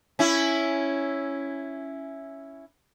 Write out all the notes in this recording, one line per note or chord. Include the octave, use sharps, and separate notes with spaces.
C#4 E4